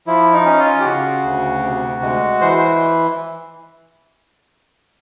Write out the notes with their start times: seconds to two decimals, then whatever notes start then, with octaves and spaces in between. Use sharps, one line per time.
0.07 F3 E4
0.33 D#4
0.46 C#4
0.59 F4
0.81 G4
0.85 C#3 F#4
1.24 D2
1.63 C3
2.02 G#3
2.41 E3 C5
2.58 C5